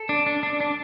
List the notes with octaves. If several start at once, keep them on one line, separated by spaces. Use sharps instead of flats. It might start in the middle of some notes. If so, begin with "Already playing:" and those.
Already playing: A4
D4
D4
D4
D4